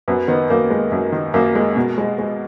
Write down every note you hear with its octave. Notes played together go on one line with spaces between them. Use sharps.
F#2 B3
D#3 B3
F#2 A#3
G#3
F#2
D#3
F#2 A#3
G#3
B2
G#3
G#3